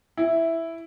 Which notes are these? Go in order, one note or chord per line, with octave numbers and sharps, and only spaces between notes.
E4